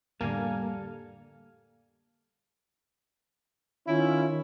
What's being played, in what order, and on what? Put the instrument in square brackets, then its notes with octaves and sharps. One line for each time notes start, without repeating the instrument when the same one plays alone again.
[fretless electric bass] F2 A2 D3 [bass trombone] G3 [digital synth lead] A#3 [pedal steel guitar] A4 F5 G#5
[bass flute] D#3 [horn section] C#4 E4 [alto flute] F4